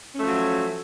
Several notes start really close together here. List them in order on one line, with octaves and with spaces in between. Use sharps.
C#4 A3 F3 F#3